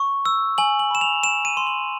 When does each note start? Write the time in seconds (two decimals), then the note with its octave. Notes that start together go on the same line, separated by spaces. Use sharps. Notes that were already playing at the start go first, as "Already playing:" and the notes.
Already playing: C#6
0.26 E6
0.58 G#5 F#7
0.79 F#7
0.91 B5 E7
1.01 F7
1.23 G#5 E7
1.45 D#7
1.57 C6
1.67 F#7